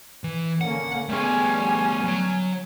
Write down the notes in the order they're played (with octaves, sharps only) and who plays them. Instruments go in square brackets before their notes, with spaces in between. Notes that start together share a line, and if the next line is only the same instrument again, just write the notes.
[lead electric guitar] E3
[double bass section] D3 A#3 C#4 [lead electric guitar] F#5
[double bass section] D3 G3 B3 [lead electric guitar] A3 G#4 [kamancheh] C#4 G#5
[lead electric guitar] F#3 C#5